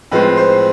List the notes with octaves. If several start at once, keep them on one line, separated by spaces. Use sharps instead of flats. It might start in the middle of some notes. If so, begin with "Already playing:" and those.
A2 F3 G#3 C4 B4
C5